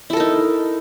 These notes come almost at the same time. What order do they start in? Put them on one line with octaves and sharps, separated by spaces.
E4 A4 A#4 D#4